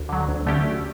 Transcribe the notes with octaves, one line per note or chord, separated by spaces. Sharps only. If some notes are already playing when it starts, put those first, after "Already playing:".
Already playing: D2
D3 F#3
D2
D3 A3 C#4 G4
D2